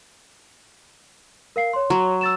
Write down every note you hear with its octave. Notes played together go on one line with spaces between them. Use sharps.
A#4 F5 C7
C#5 C6
F#3
E6 A6 E7